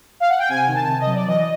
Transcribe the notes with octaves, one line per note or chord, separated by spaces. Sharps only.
F5
F#5
G5
C3 G#5
D#3
A5
C3
D#5
F#3
D5
E3 D#5